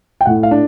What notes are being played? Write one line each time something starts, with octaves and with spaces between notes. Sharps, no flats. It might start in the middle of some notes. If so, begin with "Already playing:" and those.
G5
A2 F#5
F5
D4